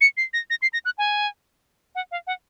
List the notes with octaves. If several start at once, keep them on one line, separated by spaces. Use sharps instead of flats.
C#7
C7
A#6
A#6
C7
A#6
F#6
G#5
F#5
F5
F#5